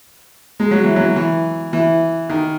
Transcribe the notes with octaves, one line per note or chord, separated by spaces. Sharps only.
G#3
F#3
E3
F#3
E3
E3
D#3